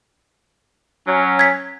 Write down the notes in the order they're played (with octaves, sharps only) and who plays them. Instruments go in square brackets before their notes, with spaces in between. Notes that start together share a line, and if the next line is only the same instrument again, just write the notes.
[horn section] F#3 C#4
[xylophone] G#6 B6